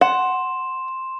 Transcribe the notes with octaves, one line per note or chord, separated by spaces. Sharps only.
F#5 C6 E7